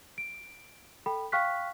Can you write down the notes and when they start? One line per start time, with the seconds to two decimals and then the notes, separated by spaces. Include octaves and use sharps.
0.18 D7
1.06 A4 G5 B5
1.32 F5 G5 C#6 F6 F#6 B6